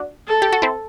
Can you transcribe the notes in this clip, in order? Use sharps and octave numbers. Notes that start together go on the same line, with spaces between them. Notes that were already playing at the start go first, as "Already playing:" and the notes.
Already playing: D4 F#4
A4
G4
F#4
C4 E4